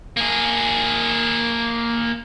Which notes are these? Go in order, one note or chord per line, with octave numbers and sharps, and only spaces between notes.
A#3 G#4